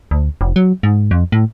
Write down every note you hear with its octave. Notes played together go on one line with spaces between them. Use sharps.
D2
F1
F#3
G#2
F2
A2